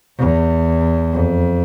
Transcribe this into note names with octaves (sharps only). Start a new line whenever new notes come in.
E2
F2